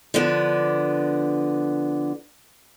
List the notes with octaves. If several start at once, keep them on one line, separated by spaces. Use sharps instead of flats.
D3 F3 B3 D4